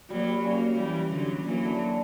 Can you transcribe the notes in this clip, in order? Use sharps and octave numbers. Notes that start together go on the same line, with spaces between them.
F#3 G3 A#3
G3
C#3 F#3 A#3
E3 G3
D3 F#3
E3 F#3 A#3
D3